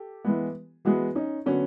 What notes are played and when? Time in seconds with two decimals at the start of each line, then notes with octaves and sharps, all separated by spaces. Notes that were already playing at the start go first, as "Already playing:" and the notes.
Already playing: G4 A4
0.25 E3 G#3 B3
0.85 E3 G#3 B3 F#4 G#4
1.15 C#4 D#4
1.46 D3 F#3 B3 C#4